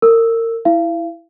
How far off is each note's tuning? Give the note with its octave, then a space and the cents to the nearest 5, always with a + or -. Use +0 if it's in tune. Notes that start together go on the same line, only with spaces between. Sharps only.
A#4 -30 E6 +0
E4 +0 F5 -40